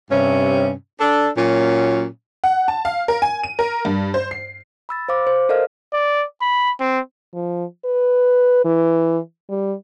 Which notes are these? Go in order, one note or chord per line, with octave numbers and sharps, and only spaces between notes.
G2 C3 C#4
D4 A4
A#2 F#3 C#4
F#5
A5
F5
A#4
G#5
D#7
A#4
G2
C5
C7
B5 E6 A6
C5 F5 D6
C5
A4 A#4 D5 D#5 F5 F6
D5
B5
C4
F3
B4
E3
G3